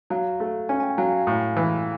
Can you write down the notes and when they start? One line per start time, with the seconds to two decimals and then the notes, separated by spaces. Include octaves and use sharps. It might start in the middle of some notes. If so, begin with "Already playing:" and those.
0.10 F#3 F5
0.40 A3
0.69 C#4 G#5
0.80 G#5
0.83 G5
0.98 F#3 F5
1.12 F5
1.27 A2
1.57 E3